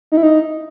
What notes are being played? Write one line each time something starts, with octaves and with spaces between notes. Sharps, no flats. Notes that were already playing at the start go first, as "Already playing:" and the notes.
D#4
E4
D#4